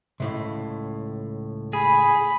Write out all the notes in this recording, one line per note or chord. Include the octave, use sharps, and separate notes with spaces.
C#2 A2 C3
G#4 B5